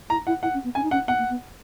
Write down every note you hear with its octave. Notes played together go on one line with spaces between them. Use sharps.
E4 A#5
E4 F#5
E4 F#5
C#4
B3
C#4 G#5
D#4
C#4 F#5
B3 F#5
A#3
B3